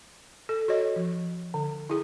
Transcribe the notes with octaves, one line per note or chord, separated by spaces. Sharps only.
A4
F#4 A4 C#5 D#5
F3
D3
E4 G#4